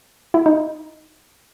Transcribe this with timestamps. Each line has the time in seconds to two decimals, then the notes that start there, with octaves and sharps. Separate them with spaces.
0.34 E4
0.46 D#4